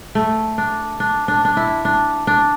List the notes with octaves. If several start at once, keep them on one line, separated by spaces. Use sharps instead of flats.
A3
D4
D4
D4
D4
E4
D4
D4